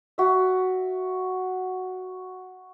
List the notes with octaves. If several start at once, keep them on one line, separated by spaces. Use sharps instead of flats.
F#4 E5